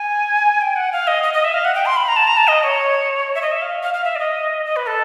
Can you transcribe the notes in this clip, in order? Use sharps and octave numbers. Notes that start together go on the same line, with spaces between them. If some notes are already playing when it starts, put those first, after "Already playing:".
Already playing: G#5
G5
F#5
F5
D#5
D#5
D#5
E5
F5
F#5
G5
C6
B5
A#5
A5
A#5
A5
D#5
C#5
E5
D#5
E5
F5
F5
F5
E5
D5
D#5
D#5
B4
A4